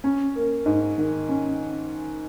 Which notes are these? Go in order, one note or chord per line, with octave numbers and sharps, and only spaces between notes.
C#4
A#3
G#2
D#3
C#4